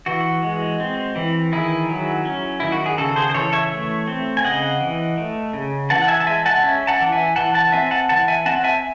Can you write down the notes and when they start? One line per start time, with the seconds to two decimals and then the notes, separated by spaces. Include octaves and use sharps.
0.06 E3 F#4
0.43 G#3
0.80 C4
1.16 E3
1.52 D#3 E4 G#4
1.89 F#3
2.25 C#4
2.60 D#3 E4
2.72 F#4
2.86 G#4
2.98 C#3 F#4 A4
3.16 G#4 C5
3.30 C5
3.34 E3 A4 C#5
3.53 C#5 E5
3.71 A3
4.07 C4
4.37 G#5
4.44 C#3 D#5 F#5
4.80 E3
5.17 A3
5.53 C#3
5.90 E3 F#5 A5
6.02 F#5
6.08 E5 G#5
6.20 A5
6.26 G#3 E5 G#5
6.46 F#5 A5
6.63 C#4 E5 G#5
6.87 F#5 A5
7.00 E3
7.12 E5 G#5
7.36 E3 F#5 A5
7.54 F#5 A5
7.72 C4 E5 G#5
7.91 F#5 A5
8.09 E3 F#5 A5
8.28 E5 G#5
8.46 C4 F#5 A5
8.64 E5 G#5